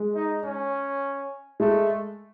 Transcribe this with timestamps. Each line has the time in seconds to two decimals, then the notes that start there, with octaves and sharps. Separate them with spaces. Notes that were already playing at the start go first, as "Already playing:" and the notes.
Already playing: G#3
0.15 D#4
0.44 C#4
1.60 G#3 A3